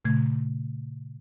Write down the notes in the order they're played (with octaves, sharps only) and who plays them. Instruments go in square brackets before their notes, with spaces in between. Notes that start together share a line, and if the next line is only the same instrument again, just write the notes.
[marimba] A#2 C#3 A3 G#6